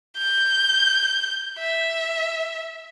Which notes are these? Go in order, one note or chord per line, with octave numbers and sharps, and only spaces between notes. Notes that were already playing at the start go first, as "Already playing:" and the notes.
G6
E5